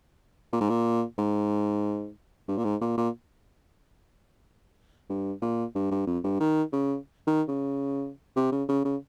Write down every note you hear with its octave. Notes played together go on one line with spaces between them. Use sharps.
A#2
G#2
A#2
G#2
G2
A#2
G#2
A#2
A#2
G2
A#2
G2
G2
F2
G2
D#3
C#3
D#3
C#3
C3
C#3
C#3
C#3